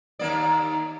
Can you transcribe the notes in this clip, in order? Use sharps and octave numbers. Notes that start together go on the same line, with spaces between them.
D#2 A#3 D5